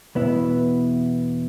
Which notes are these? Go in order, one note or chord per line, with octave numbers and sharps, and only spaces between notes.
E2 B2 B3 E4